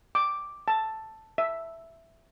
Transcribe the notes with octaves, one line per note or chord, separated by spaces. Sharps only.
D6
A5
E5